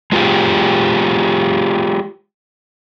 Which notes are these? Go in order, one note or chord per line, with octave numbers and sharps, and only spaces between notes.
G#3 F4 G4 G#4